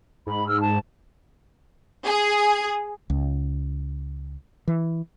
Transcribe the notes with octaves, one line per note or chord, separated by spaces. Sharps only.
G#2 B5
E6 F6
A5
G#4
C#2
E3